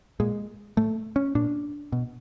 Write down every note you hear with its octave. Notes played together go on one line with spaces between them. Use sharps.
A#2 G#3
A2 A3
C#4
A#2 D4
B2